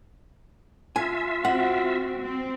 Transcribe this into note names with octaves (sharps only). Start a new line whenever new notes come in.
F4 E5 G#5
C4 F#4 F#5
C4